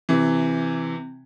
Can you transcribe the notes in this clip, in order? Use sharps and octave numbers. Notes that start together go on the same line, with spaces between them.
C3 E3